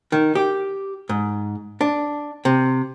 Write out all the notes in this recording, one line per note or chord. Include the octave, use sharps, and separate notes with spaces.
D#3
G4
G#2
D4
C3